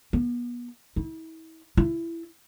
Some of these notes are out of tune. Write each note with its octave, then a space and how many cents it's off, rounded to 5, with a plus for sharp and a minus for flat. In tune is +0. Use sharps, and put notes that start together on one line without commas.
B3 -35
E4 -35
E4 +20